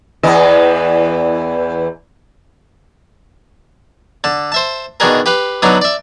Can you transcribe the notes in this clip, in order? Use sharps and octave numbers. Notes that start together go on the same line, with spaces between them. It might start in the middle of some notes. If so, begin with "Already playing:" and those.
E2 E3 D#5
D3 A5
C5 E5 A5
B2 D#3 D4 G#4 A#4
G4 B4 F5
D3 F#3 B3 D4 D#4
D5 E5